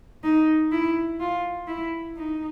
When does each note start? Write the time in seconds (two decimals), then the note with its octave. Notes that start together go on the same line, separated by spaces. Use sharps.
0.24 D#4
0.72 E4
1.20 F4
1.68 E4
2.17 D#4